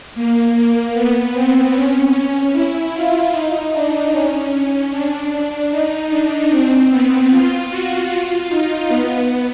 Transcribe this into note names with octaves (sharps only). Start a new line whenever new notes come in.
A#3
B3
C4
C#4
E4
F4
D#4
D4
C#4
D4
D4
D#4
D4
C4
B3
F4
F#4
F4
D#4
B3